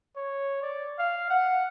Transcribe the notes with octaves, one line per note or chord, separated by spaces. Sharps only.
C#5
D5
F5
F#5